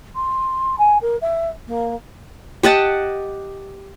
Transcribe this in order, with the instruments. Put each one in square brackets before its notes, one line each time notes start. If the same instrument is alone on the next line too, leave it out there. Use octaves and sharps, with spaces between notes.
[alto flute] C6
G#5
A#4
E5
A#3
[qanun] G4 D#5 F#5 A5